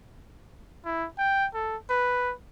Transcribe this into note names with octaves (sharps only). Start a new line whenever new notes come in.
E4
G5
A4
B4